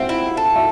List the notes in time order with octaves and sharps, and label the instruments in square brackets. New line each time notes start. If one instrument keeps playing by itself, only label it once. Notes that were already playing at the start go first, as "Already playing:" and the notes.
Already playing: [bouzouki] C4 [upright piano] E5 F#5
[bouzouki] E4
A4
[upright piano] E5